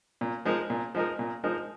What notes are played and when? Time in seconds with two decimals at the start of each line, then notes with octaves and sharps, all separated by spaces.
0.21 A#2
0.45 F3 G#3 D#4 A#4
0.70 A#2
0.95 F3 G#3 D#4 A#4
1.19 A#2
1.44 F3 G#3 D#4 A#4